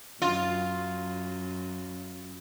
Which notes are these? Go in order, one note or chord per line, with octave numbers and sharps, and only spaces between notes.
F#2 F4